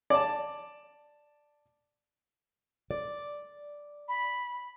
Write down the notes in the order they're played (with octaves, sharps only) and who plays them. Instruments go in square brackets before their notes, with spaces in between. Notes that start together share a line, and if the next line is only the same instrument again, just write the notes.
[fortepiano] D5 A5
[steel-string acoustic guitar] D5
[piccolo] B5